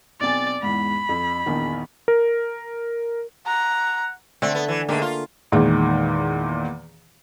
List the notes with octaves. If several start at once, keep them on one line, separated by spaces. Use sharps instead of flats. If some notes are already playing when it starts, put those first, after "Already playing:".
B1 C4 D5 G#5 A6
E2 G#2 B5
F2
A#1 E2 D#3
A#4
F#5 A#5
D3 A3 C4 A4
B3
E3
G#2 D3 A3 A#3 G4
F4
E2 A#2 D#3 G#3